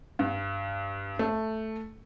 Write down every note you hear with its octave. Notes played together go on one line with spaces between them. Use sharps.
G2
A3